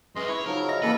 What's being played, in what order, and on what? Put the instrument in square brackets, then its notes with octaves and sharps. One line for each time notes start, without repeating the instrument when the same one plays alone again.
[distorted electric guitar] F#2 [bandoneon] G#3 D#5 C6 [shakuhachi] B4
[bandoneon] E4 [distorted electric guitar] C#5
[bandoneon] C#3 F3 F#3 [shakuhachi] D#4 [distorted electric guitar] A#4
[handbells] D#5 A#6 [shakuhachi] E5
[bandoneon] C#3 E3 A4 [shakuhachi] A#3 [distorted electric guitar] B4